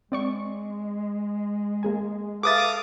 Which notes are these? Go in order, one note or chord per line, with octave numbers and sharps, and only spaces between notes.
G#3 C4 D5 C#6
A#3 G#4 G#5
G#4 A4 B4 E5 F5 D6 D#6 A6